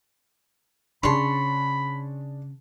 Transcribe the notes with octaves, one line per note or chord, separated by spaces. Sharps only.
C#3 D4 G#4 C#5 A5 B5 C6